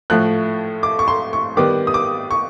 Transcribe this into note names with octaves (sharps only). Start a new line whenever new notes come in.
A2 F3 A3 F#6
D6
C#6
C6
C#6
D#3 G3 B3 D6
D#6
D6
C#6